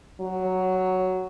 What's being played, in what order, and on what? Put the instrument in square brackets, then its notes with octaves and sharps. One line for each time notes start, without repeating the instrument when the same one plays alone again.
[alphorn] F#3